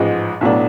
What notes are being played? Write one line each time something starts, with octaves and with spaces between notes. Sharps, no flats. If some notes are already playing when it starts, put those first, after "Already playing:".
Already playing: A1 G#2 F3 G#3
B1 A2 F#3 B3 D4